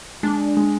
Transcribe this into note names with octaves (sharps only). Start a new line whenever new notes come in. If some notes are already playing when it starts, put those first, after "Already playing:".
G#3 D4
G#3